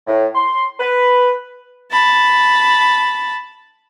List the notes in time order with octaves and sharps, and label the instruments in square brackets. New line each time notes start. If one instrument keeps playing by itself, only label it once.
[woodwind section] A2
C6
B4
[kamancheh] A5 B5